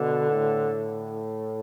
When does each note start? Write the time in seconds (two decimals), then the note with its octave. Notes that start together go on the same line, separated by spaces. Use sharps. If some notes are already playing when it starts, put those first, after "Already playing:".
Already playing: B2 D3
0.30 A2